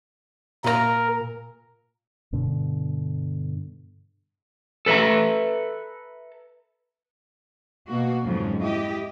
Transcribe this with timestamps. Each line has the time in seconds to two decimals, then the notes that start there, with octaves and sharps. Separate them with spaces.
0.64 A#2 A#4 B4 A#5
2.33 G2 B2 D3
4.86 A4 B4 D5 E5 A#5
7.87 B2 A#3 F#4
8.25 F2 G#2 C#3 F3 F#3
8.61 E4 G4 D#5